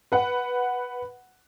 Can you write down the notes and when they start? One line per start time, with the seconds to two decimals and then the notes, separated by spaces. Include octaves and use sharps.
0.12 B4 F#5